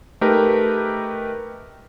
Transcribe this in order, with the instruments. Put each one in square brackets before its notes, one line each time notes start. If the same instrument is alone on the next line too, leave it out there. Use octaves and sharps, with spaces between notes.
[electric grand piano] A3 D#4 G4 A#4 B4